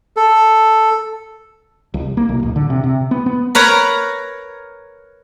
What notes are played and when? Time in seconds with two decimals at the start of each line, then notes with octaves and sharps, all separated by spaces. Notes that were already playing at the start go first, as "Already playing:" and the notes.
0.17 A4
1.94 C2
2.17 A#3
2.29 B1
2.43 D1
2.56 D3
2.70 C3
2.84 C3
3.11 B3
3.26 B3
3.55 A#4 B4 C#5 A#5